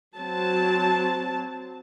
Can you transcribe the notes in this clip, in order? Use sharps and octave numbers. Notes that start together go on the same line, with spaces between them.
F#3 C4 A5